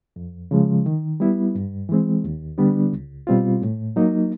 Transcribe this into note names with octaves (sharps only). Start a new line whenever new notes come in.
F2
C#3 F3 G#3
D#3
G3 B3 E4
G2
E3 G#3 C4
D#2
D3 G3 B3 D4
C#2
B2 G3 C4 F4
A2
F#3 A#3 D#4